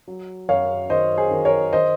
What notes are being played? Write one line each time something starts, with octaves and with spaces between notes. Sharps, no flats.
F#3
F#2 C#5 F5
D#3 C5 D#5
G#4 C5
D#3
A#4 C#5
D#3 C5 D#5